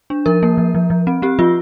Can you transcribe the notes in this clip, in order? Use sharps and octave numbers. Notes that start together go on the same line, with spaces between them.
D4
F3 A#4
A#3
F3
F3
F3
C4
C4 G4
F3 F4